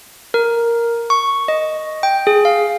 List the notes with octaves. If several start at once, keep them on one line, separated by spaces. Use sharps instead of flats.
A#4
C#6
D#5
G5
G#4
F5